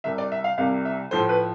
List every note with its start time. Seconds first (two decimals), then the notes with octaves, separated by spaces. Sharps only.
0.04 C2 C3 G3 E5
0.18 D5
0.32 E5
0.44 F5
0.58 C2 C3 G3 F5
0.85 E5
1.11 A2 F3 A3 C5
1.29 B4